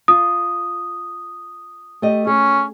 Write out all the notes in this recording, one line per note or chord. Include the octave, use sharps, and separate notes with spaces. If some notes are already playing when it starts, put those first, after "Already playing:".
F4 D#6
A3 G4 D#5
C#4 G#4